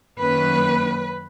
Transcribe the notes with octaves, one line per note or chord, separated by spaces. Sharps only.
F#2 D#3 A#3 C#4 B4